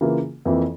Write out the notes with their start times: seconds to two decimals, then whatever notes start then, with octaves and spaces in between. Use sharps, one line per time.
0.01 C#3 E3 A#3 F4 G#4
0.45 F2 E3 A#3 F4